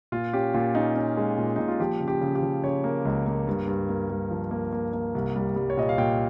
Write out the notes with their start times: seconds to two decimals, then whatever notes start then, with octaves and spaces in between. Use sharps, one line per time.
0.12 A#2 F4
0.33 C#4 G4
0.54 A#2 F4
0.75 C#4 D#4
0.95 C#4
1.17 G#3
1.38 A#2
1.56 A#2 D#4
1.68 F4
1.80 F3 G4
2.00 C#3
2.08 G4
2.21 C#3
2.35 G4
2.42 F3
2.64 C#3 C#5
2.84 A#3
3.05 C#2
3.26 A#3
3.47 G2
3.68 G2
3.89 A#3
4.10 G2
4.30 F3
4.51 A#3
4.72 A#3
4.93 A#3
5.15 C2
5.36 G3
5.56 G3
5.70 C#5
5.77 A#2 D#5
5.89 F5
5.98 A#2 G5